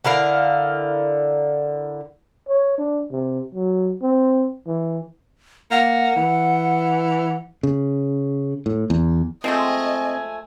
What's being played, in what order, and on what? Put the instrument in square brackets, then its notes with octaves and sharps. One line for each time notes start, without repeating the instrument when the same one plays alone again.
[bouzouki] D3 E4 A#4 F5
[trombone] C#5
D4
C3
F#3
C4
E3
[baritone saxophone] A#3 [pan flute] F#5
[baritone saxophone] E3
[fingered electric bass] C#3
A2
E2
[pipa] F3 G#3 A3 [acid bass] C4 [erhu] D#5 [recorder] G#5